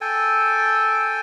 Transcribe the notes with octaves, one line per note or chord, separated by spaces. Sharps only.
A4 G5 G#5